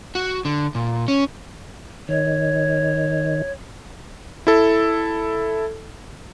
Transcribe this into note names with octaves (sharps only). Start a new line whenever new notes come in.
F#4
D3
A#2
C#4
D#3 C#5
E4 A4